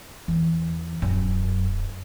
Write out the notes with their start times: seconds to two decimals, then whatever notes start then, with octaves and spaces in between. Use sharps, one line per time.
0.28 E2 E3
1.02 D1 F#2